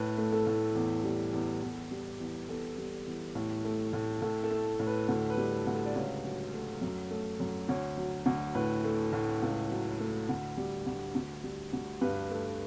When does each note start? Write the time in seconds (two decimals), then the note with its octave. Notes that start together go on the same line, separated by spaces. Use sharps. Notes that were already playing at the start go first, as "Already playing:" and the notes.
Already playing: A2 B4
0.17 A3
0.32 A4
0.47 A2
0.75 E2
1.04 G3
1.33 E2
1.62 E2
1.91 G3
2.20 E2
2.48 E2 A4
2.78 G3
3.06 E2
3.35 A2
3.64 A3
3.93 A2
4.22 A2 A4
4.43 A4
4.51 A3
4.79 A2
4.87 B4
5.08 D2 A4
5.30 B4
5.37 G3
5.52 A4
5.66 D2
5.74 A4
5.86 D5
5.95 C#2 C#5
6.24 F#3
6.53 A3
6.81 F#2
7.10 A3
7.40 F#2
7.68 D2 C#5
7.97 F#3
8.26 D2
8.55 A2 B4
8.84 A3
9.13 A2
9.42 C#2
9.70 F#3
10.00 A3
10.29 D2
10.57 G3
10.86 D2
11.15 D2
11.43 G3
11.73 D2
12.01 G2 B4
12.30 A3